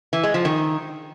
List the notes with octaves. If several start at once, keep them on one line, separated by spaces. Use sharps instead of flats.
E3
G#3
F3
D#3